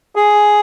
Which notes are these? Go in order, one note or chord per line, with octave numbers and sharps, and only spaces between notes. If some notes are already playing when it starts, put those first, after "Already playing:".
G#4